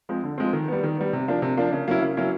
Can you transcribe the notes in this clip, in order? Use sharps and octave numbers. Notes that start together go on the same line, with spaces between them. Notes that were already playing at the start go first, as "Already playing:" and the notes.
F3 G#3 C4
D3
F3 G#3 C4
D#3
G3 B3
D#3
G3 B3
C3
F3 A#3 D4
C3
F3 A#3 D4
C#3
F#3 A#3 C#4 E4
C#3
F#3 A#3 C#4 E4